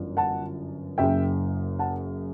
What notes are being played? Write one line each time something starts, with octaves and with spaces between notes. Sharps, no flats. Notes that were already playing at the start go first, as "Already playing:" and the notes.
Already playing: G1 F#2 E3
F#5 A5
F#1 F#2 C#3 E5 G5
F#5 A5